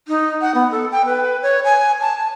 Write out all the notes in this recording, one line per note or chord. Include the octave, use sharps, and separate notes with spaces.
D#4
F#5
B3
A4
G5
B4
C#5
G#5
A5